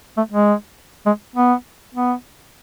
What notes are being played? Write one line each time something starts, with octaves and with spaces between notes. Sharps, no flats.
A3
G#3
G#3
B3
B3